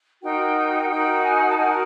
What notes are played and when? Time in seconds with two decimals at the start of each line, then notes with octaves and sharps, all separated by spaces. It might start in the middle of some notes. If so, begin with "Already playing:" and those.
0.22 D#4 F#4 A#4 G5
0.57 G5
0.90 D#4 F#4 A#4 G5
1.24 G#5
1.50 A5
1.57 D#4 F#4 A#4 G#5